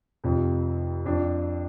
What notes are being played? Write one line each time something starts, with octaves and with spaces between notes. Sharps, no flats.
F1 F2 C3 F3
F2 F3 D4